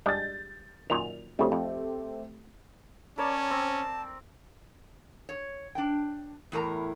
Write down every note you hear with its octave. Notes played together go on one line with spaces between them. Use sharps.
G3 G#3 D4 G6 A6
F#2 A#2 D#3 F7
C#3 F3 G3 A3 C4 G4
F2
C#4 A#4 C#5 D5 A5
C4
C#5
D4 G5
E2 A2 A#4 A#5